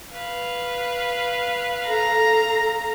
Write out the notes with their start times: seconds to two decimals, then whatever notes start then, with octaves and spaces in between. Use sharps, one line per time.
0.12 B4 F5
1.87 A4 A#5